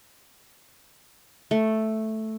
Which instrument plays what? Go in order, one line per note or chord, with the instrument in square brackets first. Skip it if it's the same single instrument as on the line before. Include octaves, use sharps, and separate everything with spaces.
[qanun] A3